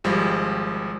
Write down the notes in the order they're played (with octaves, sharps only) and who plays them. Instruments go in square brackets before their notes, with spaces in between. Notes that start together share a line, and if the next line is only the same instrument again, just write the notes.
[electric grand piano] G#1 F3 G3 G#3